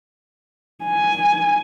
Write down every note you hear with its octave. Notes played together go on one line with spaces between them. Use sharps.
G#5